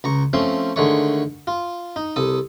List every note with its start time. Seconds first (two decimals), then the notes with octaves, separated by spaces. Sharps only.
0.04 C#2 A#5 C#6
0.33 F3 A3 C4 C#4 C6
0.76 D3 D#3 G#3 A3 C#5 C#6
1.47 F4
1.96 D#4
2.16 C2 A4 D#6